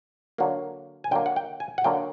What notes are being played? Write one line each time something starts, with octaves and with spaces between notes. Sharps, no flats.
D3 F#3 A#3
G#5
D3 F#3 A#3 G5
F#5
G5
G#5
F#5
D3 F#3 A#3 G5